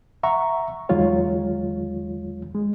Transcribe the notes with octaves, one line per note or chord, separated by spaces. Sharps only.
E5 F#5 A#5 C#6
E2 D#3 F#3 G#3 F4 C#5
G#3